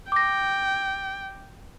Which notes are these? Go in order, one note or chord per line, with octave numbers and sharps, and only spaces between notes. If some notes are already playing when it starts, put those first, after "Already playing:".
G5 D6 A#6